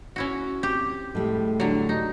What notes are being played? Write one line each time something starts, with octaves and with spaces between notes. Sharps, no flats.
C#4 E4 F#4
C4 G4
A2 G3 G#3
D3 F#3
D#4